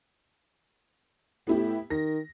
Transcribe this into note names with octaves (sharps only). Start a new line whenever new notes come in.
A2 B3 E4 G4
D#3 A#6